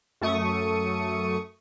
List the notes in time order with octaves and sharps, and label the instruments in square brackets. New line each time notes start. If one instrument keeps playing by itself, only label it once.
[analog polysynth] F#2 A3 C#6 D#6